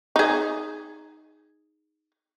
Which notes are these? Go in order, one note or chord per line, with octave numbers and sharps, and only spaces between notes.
D#4 G#4